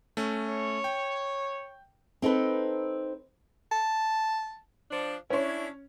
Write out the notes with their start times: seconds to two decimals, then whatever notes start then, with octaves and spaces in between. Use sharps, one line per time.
0.17 A3 C#4
0.46 C#5
0.84 G5
2.22 C4 D#4 A4 B4
3.71 A5
4.90 F3 D4
5.30 C#4 D4 E4 C#5